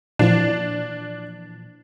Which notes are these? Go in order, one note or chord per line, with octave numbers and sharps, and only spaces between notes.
A#2 E3 F3 D4